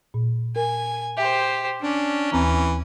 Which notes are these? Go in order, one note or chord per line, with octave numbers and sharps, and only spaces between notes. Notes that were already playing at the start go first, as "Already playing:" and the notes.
A#2
A#4 G#5
G4 C5 E5
C#4 D4
D#2 E3 C4 A#5